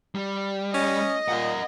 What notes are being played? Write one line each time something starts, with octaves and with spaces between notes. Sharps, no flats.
G3
C#4 D#5
A#2 A#4 F#5